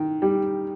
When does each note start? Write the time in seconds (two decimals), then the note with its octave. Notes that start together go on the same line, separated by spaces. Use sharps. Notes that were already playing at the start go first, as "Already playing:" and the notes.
Already playing: D#3
0.22 G3